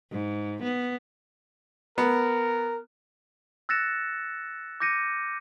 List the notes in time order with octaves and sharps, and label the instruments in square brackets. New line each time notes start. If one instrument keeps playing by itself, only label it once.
[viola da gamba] G#2
B3
[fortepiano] B3 [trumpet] A#4
[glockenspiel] E6 F#6 A6 A#6 C#7 E7
D6 G6 A#6 C#7 D#7